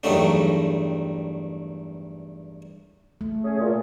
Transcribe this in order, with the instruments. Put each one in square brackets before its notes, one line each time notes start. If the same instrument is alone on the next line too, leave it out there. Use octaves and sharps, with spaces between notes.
[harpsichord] E2 G2 D#3 F#3 A3 D4
[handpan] A3
[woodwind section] C#4 G#4
A#2